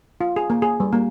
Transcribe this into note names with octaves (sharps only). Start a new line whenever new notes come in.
F4
G#4
A#3
G#4
G3
A#3